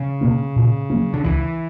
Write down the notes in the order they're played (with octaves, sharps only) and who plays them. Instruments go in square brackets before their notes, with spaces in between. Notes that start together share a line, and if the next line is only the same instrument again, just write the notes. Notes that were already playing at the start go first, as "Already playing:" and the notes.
Already playing: [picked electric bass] C#3
[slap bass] B2 A#3 C#4
A#2
F#3 A#3 C#4
[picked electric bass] D3
[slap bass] C#2 [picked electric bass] E3